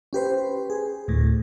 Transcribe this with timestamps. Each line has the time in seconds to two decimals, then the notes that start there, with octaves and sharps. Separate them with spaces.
0.13 C#4 G4 B4 C5
0.70 G#4
1.08 D2 A2